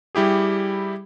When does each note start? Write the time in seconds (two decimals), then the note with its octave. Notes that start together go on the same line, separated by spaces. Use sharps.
0.15 G3 E4 G4 G#4